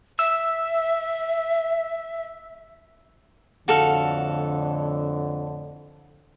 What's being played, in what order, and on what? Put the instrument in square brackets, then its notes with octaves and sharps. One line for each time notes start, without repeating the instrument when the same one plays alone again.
[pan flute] E5 [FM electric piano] E6
[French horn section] F2 A2 D3 [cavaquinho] F#4 A4 F5